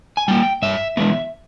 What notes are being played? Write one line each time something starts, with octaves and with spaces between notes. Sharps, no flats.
G#5
G3 A#3 G5
G2 E5
E3 G#3 B3 E5